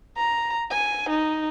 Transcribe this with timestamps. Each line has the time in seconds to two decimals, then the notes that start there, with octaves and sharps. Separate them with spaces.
0.17 A#5
0.71 G#5
1.09 D#4